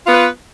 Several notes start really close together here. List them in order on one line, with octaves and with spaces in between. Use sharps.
F4 B3 B4